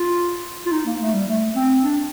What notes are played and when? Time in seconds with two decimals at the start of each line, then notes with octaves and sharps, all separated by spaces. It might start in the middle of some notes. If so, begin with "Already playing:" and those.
Already playing: F4
0.66 F4
0.72 D#4
0.86 A#3
1.01 A3
1.14 G3
1.28 A3
1.56 C4
1.83 D4